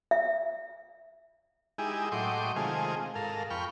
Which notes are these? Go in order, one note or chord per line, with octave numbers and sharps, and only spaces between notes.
E5
G#3 D#4 E4 G4 G#4
A2 F#3 D#5 G5 C6 D6
C3 D#3 G#3 A3 F4 G#4
G#2 A4 A#4 F5
F2 G5 B5 C#6 F6